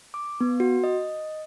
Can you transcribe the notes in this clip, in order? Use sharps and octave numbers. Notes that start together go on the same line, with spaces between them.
D6
B3
F#4
D#5